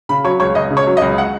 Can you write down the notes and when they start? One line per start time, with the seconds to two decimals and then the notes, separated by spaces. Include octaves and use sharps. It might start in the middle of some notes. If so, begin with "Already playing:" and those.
0.09 C#3 B5
0.24 F#3 C#5
0.40 C#2 C#5
0.55 C#2 D#5
0.70 C#3
0.77 C#5
0.87 F#3
0.97 D#5
1.02 C#2
1.18 F#5